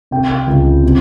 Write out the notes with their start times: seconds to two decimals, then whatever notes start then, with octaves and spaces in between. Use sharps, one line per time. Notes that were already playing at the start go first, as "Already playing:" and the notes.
0.11 C3 G5
0.47 C#2
0.83 C3